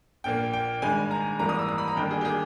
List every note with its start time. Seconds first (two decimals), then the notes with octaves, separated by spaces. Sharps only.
0.24 A#1 A#2 A#3 G5
0.53 G5
0.82 G#1 G2 D#3 G#3 G#5
1.11 A#5
1.39 G#1 G#2 E3 G3 A#3 A#5
1.49 D#6
1.59 E6
1.69 D#6
1.78 B5
1.88 A#5
1.96 G1 G2 D#3 A#3 G5
2.11 G#4
2.21 G4
2.25 G#4